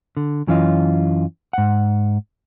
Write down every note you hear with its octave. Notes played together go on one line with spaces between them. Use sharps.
D3
F#2 E3 C#4 F4 D#5
G#2 F#5